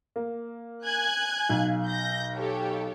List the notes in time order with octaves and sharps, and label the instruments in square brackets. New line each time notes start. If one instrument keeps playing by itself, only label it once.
[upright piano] A#3
[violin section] G#5 F#6 G#6
[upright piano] B1 F5
[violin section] G6 A#6
G4 A4 C#5